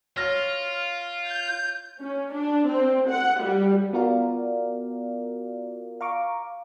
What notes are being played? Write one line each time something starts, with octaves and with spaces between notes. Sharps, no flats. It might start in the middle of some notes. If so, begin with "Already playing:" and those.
F4 C#5 F6 A#6
G6
C#4
D4
C4
F#5
G3
B3 F4 F#4 A#4 D5 F5
F5 A#5 C#6 D6